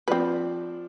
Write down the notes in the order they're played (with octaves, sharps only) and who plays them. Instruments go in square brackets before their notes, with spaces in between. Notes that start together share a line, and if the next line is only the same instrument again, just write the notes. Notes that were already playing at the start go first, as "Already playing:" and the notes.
[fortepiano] F3 D4 [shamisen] C4 B4